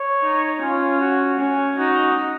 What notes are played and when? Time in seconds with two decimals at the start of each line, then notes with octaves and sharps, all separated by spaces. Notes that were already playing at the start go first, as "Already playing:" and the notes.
Already playing: C#5
0.22 D#4
0.60 C#4 F4
1.00 F#4
1.39 C#4
1.78 D#4 F#4